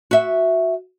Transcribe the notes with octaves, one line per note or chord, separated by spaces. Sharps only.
F#4 E5